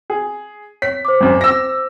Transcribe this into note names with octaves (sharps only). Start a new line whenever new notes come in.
G#4
C#5 B6
C5 D6
G#1 F#2
E6 A#6